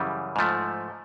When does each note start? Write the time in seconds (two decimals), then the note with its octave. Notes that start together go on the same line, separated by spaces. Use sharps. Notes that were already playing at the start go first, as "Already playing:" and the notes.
Already playing: F#2 C#3 E3 G3
0.36 G#2 F3 A3